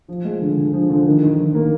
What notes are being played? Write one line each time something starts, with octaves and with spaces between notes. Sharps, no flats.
F3
G#3
D3
D3
F3
D3
D#3
D#3
D#3
A#3